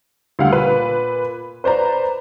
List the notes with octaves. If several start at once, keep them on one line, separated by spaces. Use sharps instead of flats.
D2 G3 F5 F#5
A#2 B4
B4 C5 D5 A#5